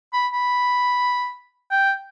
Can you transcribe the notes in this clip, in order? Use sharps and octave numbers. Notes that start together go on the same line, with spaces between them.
B5
B5
G5